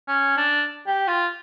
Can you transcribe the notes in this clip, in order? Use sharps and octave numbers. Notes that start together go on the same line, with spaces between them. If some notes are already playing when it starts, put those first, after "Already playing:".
C#4
D4
G4
F4